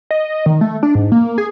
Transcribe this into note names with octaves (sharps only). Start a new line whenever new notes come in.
D#5
D#3
A3
D4
G#2
A#3
G#4